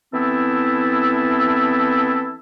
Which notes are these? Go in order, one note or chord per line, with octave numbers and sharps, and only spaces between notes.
E3 B3 C4 E4 A4